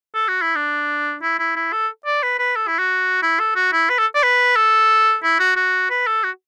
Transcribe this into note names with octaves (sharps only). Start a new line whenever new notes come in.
A4
F#4
E4
D4
E4
E4
E4
A4
D5
B4
B4
A4
E4
F#4
E4
A4
F#4
E4
B4
A4
D5
B4
A4
E4
F#4
F#4
B4
A4
F#4